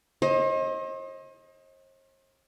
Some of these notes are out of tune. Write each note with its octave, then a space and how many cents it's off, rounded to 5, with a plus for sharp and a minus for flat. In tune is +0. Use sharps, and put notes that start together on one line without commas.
C5 +45 D#5 +20